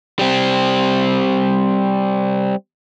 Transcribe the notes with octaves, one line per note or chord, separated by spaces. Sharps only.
G3 C4